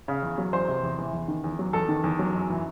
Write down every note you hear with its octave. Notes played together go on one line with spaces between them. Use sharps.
C#3
E2
F#3
E2 C5
C3
E2
E3
E2
D#3
E2
F#3
E2 A4
D#3
E2
F#3
F#2
E3